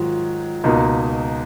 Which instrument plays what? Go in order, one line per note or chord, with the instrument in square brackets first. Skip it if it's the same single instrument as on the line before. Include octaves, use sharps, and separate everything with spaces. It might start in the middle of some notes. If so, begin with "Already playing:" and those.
Already playing: [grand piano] G#2 D#3 F#3 [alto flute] F4
[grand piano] C#2 B2 A#3 D#4